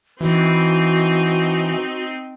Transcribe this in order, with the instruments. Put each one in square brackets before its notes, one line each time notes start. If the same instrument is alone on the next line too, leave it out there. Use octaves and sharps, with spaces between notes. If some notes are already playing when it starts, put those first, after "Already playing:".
[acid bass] E3 [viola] C4 D#4 [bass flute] F#4